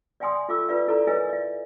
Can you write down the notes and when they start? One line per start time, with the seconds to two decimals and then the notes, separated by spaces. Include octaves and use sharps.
0.20 D5 E5 G5 G#5 C6 D#6
0.49 F4 A4 E5 D6 E6
0.69 F4 B4 D5 E5
0.88 E4 A4 D5 A#5
1.07 A#4 B4 C#5 D#5 E5 G#5
1.29 D5 E5